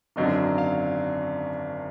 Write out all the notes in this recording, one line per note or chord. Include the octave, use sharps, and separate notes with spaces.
G#1 F#2 D3 F#3 D4 D#5
F5